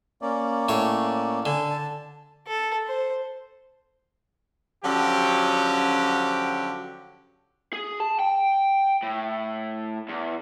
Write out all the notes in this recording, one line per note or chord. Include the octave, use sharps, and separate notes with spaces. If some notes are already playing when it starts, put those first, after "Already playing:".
A#3 C#4 D5
A2 C#5
D3 G#5
A5
A4
C5
D3 F3 F#3 C#4 G4
G#4
A5
G5
A2
E2